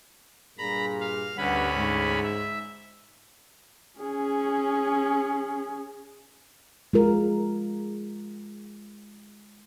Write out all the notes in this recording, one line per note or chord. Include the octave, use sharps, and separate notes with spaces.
G2 A#2 G#4 A#5 B5
F5
D2 G2 C#4 F#5 B5
G#2
E5
C#4 G#4
G#3 F4 A#4